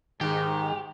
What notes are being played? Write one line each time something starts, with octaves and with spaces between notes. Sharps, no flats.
G#2 D#3 G4